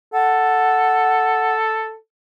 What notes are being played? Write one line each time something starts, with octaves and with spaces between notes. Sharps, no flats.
A4 F#5